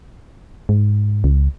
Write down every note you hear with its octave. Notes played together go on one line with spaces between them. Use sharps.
G#2
C#2